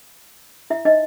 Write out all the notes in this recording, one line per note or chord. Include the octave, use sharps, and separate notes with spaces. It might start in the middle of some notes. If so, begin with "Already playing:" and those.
E4 E5
D#4 D#5